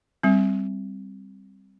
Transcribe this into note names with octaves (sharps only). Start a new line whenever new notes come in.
G3 C4